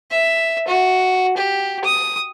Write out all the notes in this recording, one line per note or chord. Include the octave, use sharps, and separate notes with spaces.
E5
F#4
G4
D#6